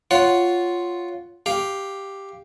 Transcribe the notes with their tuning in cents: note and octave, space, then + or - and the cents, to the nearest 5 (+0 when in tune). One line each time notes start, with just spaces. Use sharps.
F4 +0 C#5 +5 F#5 +0
G4 +0 F5 +0